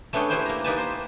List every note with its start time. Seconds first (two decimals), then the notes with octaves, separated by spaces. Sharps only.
0.13 A3 B3 C#4 D4 G#4 G5
0.30 A3 E4 G4 B4 C5 G5
0.46 A#3 A#5
0.64 A#3 D#4 G4 B4 G#5 A5
0.78 C5